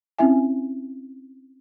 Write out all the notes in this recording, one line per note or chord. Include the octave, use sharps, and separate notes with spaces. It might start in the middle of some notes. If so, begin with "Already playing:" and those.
C4 C#4 E4 E5 G#5